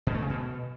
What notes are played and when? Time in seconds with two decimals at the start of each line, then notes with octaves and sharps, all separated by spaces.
0.07 B2
0.14 A3
0.22 C#3
0.30 B2